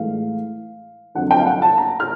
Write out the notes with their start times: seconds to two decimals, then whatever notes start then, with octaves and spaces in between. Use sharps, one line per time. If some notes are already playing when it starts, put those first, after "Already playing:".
Already playing: A2 E3 G#3 F5
1.15 F2 D3 F#3 F#5
1.31 G5
1.39 F5
1.46 F#5
1.62 A5
1.78 A#5
2.00 F6